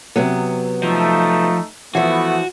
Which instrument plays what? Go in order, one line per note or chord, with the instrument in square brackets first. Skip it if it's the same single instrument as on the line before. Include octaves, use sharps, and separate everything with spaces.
[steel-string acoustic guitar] C3 F#3 B3
[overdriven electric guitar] F3 [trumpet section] A3 D#4
[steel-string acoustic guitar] E3 F3 [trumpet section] A3 B3 [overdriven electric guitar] F#4